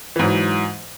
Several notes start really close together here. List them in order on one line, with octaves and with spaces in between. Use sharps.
E3 G#2 F#3